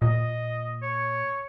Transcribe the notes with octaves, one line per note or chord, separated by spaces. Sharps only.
A#2 D#5
C#5